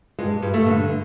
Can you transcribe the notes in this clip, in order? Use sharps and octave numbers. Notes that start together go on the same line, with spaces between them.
G2 G#3
G2
A3
D3